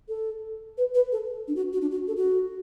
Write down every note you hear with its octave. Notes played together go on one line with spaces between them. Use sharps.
A4
B4
B4
A4
D4
F#4
F#4
D4
F#4
A4
F#4